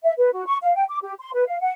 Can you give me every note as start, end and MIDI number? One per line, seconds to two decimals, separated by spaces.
0.04 0.12 76
0.18 0.32 71
0.33 0.46 66
0.46 0.57 85
0.63 0.73 77
0.75 0.84 79
0.89 0.98 86
1.02 1.13 67
1.19 1.31 84
1.34 1.46 71
1.46 1.56 77
1.61 1.72 78